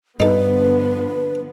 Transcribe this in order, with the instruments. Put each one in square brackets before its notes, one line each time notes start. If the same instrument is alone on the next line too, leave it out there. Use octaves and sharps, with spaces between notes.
[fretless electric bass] G2 [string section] D3 F3 B3 [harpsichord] D#4 A4 [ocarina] B4